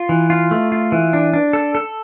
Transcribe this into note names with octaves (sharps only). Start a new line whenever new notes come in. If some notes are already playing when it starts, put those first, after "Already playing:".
Already playing: F4
E3
F4
A3
F4
E3
D4
D4
A4
A4